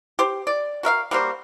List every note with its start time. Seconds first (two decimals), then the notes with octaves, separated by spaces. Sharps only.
0.19 G4 C5
0.47 D5
0.83 F#4 A#4 E5 F5
1.11 G3 A#3 F#4 C5